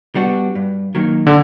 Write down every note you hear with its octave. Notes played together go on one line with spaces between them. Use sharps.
G3 B3 D4 F#4
G2
D#3 F#3 A#3
D3